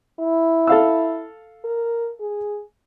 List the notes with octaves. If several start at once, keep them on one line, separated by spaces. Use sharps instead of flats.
E4
A4 F5 E6
A#4
G#4